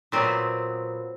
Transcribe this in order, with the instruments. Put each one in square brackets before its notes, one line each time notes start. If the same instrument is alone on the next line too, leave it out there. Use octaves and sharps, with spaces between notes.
[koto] A#2 F#3 B3 C4